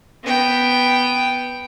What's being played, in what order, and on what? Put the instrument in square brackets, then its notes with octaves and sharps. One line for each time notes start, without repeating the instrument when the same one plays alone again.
[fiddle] B3 G5